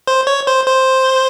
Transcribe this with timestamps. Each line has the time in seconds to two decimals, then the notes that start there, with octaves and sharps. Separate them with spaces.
0.07 C5
0.27 C#5
0.47 C5
0.66 C5